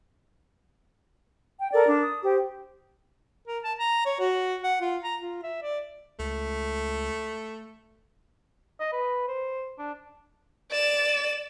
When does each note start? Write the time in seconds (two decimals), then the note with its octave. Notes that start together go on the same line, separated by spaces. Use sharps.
1.60 G5
1.73 A4 A#4 D5
1.86 D4
2.03 D#6
2.23 G4 C5
3.47 A#4
3.64 A5
3.79 A#5
4.06 C#5
4.20 F#4
4.63 F#5
4.81 F4
5.03 A#5
5.20 F4
5.43 E5
5.62 D5
6.19 C#2 A3
8.80 D#5
8.92 B4
9.28 C5
9.79 D4
10.71 D5 E7